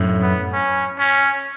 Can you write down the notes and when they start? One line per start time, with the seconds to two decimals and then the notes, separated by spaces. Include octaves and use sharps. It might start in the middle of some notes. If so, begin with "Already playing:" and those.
Already playing: F#2 A2
0.22 B3
0.53 C#4
0.99 C#4